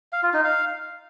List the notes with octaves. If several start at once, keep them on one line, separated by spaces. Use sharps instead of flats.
F5
F4
D#4
F5